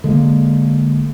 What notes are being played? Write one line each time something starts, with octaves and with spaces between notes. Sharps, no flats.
D3 G#3 A#3